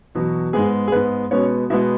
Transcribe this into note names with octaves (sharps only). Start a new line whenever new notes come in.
E2 B2 F#3
G#2 G#3 B3 G#4
G#4
G#2 G#3 B3 B4
B2 G#3 B3 C#4 C#5
B2 G#3 B3 E4 E5